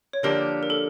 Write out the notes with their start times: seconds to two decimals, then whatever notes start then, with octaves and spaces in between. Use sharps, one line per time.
0.13 C#5
0.23 D3 F3 A#3 D4 G4 A#4
0.63 A#4
0.70 A4